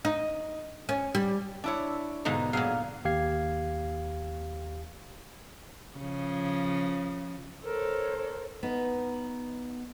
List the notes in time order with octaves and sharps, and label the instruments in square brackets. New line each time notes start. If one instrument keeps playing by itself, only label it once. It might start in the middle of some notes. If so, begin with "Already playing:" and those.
[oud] D#4
C#4
G3
[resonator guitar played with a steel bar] D4 E4 C#5
[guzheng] G#2 B2 D3 [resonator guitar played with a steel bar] D#4
[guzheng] A#2 F5 [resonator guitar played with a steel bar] F#3 G#4
[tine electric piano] D#2 G4 F5 G#6 C7
[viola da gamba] C#3 F3
[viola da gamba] A4 [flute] A#4 [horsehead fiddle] C5 C#5
[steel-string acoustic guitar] B3 D#4